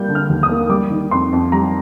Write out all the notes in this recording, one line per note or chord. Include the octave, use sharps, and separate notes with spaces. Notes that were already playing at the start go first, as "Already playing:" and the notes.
Already playing: G3 A#3 G6
D3
F6
D#2
D#6
A#3
G3 D6
D#3
F2 C6
F2
G3 A#5